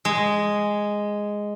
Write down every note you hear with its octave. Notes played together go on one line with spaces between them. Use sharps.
G#3